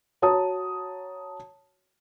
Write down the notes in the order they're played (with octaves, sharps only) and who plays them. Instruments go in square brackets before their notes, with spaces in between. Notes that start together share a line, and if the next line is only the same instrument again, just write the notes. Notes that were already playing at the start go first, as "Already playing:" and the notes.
[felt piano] F#4 C#5 A5 A#5 D#6